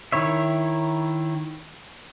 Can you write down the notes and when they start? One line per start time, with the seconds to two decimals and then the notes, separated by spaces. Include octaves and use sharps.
0.12 D#3 E4 C#5 E5